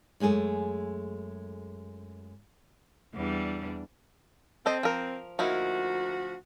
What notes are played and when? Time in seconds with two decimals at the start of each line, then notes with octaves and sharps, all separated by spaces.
0.20 F#2 G#3 A3 G#4 A4
3.14 E2 G3 D4
4.66 C4 A4 C5 D#5
4.83 F3 A#4
5.39 D2 F3 A#3 D#4 E4 F#4